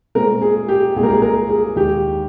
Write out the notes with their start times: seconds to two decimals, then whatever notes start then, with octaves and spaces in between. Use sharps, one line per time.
0.15 A#2 G#3 C4 A#4
0.42 G#4
0.68 G4
0.96 C2 A#2 G#3 G#4
1.03 A#4
1.10 G#4
1.22 A#4
1.49 G#4
1.76 D#2 D#3 G#3 G4